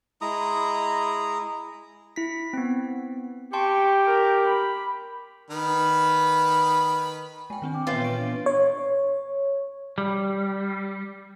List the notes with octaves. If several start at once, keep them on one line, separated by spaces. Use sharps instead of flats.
G#3 E4 A#5 D#6
E4 B6
B3 C4
G4 G5 A5 C6 C#6
A#4
B5
D#3 B4 B5
G#3 G5 G#5
D#3 C4 D4
G5 D6
A#2 E3 B3 F4 B4 C#5 E5
B4 C#6 D7
B3 D4 B4
C#5
G3